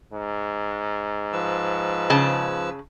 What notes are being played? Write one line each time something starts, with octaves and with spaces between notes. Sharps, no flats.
G#2
F3 B4 E6
C#3 A5